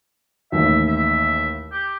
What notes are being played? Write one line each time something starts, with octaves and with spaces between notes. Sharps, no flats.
A1 D#2 E5
E5
G4